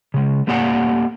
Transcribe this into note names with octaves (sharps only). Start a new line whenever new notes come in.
C#3 G#3
A3 A#3 G4 D5 F#5 G#5